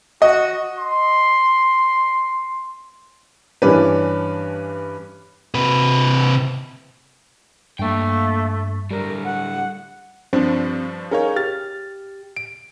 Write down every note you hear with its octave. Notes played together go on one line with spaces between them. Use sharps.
F#4 D#5
C6
G2 E3 C#4 D4 B4
C3 B4
G2 A3 A#3 G5
A2 D3 G3 A#4
F#5
G2 F3 C4 D4
C#4 D#4 G#4 A#4 C#5 F5
G4 F6 A6
D7